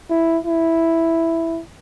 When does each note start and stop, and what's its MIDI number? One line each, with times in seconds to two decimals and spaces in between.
0.11 0.38 64
0.45 1.61 64